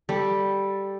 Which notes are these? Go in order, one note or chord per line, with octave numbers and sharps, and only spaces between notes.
G3 A4